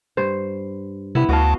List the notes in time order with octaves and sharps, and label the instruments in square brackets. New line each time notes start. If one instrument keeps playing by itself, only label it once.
[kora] G2 C5
[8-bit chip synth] C3 [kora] B3 E4
[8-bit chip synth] D2 A5 [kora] F#4 D#5 F5